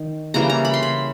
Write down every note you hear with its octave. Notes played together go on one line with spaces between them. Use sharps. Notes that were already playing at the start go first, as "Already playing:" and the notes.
Already playing: D#3
C#3 E3 G3 A#3 A#5
A#5
B5
C6
B5